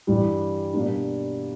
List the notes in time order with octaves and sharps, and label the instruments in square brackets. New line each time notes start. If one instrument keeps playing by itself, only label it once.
[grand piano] G2 E3 G3
B2 G3 A#3 D4